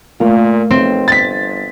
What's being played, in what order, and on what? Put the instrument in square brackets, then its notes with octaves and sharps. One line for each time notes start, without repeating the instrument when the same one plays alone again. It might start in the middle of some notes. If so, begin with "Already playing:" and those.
[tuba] A#2 [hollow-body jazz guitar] A3 A#3 F4
[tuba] B1 [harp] C4
[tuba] G1 [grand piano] A6 B6